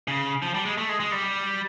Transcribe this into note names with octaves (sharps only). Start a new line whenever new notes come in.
C#3
F3
G3
G#3
A3
G#3
G#3
G3